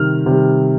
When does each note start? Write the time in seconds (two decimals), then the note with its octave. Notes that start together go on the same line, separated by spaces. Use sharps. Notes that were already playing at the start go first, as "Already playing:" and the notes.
Already playing: C3 D#3 G3 F6
0.26 C3 D#3 G3